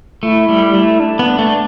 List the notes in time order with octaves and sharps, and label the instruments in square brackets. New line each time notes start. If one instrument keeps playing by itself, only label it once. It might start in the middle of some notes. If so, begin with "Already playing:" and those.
[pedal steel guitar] A3 [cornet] E4
[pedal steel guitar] G3
A3
[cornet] D4
[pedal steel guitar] B3
A3